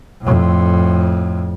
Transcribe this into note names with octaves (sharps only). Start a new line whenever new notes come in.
F2 A2